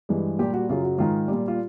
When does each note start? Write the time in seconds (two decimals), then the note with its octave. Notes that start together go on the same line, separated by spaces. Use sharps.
0.09 G2 E3 G#3
0.39 A#2 G3 G4
0.54 F#4
0.69 F#2 C#3 F#3 F4
0.84 F#4
0.98 G#2 D#3 G#3 F4
1.28 A#2 G3
1.48 F4